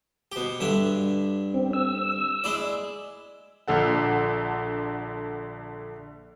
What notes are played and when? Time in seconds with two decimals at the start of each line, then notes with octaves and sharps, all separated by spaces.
0.32 B2 G4
0.60 G2 D3 E5
1.54 C4
1.73 E6
2.44 G#3 E4 D5
3.68 A#1 D3 A4 F#5